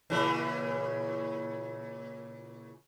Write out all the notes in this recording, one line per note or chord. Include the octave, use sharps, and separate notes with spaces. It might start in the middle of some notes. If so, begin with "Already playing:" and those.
A#2 C#3 E3